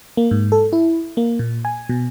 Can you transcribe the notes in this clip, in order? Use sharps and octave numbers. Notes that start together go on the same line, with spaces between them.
A#3
G#2
A4
E4
A#3
A#2
G#5
B2